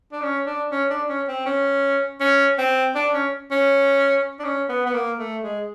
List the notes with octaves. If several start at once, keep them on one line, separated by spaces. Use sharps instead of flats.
D4
C#4
D4
C#4
D4
C#4
C4
C#4
C#4
C4
D4
C#4
C#4
D4
C#4
B3
B3
A#3
A3
G#3